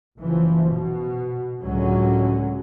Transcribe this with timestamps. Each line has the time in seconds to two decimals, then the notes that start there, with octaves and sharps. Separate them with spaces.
0.16 F#1 E3 F3
0.66 B2
1.61 C#2 A2 D3 F#3 G#3 C#4